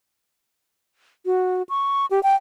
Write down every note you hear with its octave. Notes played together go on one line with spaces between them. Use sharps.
F#4
C#6
G4
G5